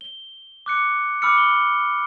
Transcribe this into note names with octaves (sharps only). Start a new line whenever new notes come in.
G7
D6 F#6 C#7
B5 D6 E6 F6 C#7
B5 G7